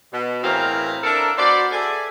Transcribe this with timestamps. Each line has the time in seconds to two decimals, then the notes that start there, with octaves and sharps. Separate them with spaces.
0.12 B2
0.44 A2 E3 C4 G#4 A#4 F5
1.04 D4 E4 A4 A#4
1.37 B3 F#4 C5 D5
1.72 G#4 A4 D5 E5 G#5